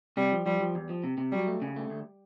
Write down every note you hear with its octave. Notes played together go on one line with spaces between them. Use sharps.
C3 G3
F3
F3 G3
F3
E2
F3
C3
C3
F#3 G3
A3
C#3
A3
D2